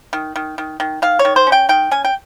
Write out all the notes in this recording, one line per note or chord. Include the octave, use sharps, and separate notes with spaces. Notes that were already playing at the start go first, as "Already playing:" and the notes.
D#3
D#3
D#3
D#3
D#3 F5
C#5
D#3
C5
C#4
G5
D#3 G5
C#4 G#5
G5